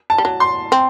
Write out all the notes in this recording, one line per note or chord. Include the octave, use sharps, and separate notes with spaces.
A5
G3
F#3
C6
C4